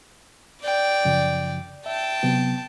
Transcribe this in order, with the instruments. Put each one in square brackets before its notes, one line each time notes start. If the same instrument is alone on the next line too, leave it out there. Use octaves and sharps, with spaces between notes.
[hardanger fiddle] D5 G5
[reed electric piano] F#2 C#3 F3
[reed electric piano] E5 [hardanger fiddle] G5 A5
[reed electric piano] C3 F#3 B3